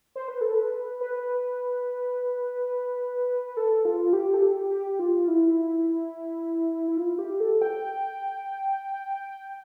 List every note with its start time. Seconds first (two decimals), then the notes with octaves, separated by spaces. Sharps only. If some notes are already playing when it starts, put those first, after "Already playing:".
0.16 C5
0.28 B4
0.41 A4
0.54 B4
1.01 B4
3.57 A4
3.85 F4
4.13 G4
4.34 A4
4.42 G4
4.70 G4
4.99 F4
5.28 E4
6.88 E4
6.97 F4
7.19 G4
7.40 A4
7.62 G5